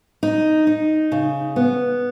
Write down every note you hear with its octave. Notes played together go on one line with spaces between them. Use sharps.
D#4
D#4
C#3
B3